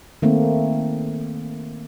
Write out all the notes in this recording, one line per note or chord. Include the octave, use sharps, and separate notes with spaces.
D#3 A3 A#3 C4